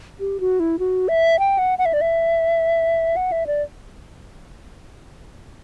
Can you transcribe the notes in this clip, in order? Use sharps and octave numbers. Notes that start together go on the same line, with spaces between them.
G4
F#4
E4
F#4
E5
G5
F#5
F#5
E5
D5
E5
F#5
E5
D5